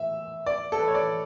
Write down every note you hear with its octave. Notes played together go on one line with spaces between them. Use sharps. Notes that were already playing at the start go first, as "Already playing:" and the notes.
Already playing: E5
D5
A4
B4
C#5
D5